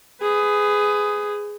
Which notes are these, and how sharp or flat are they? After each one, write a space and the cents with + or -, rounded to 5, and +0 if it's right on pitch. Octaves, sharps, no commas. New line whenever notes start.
G#4 +0 B4 +30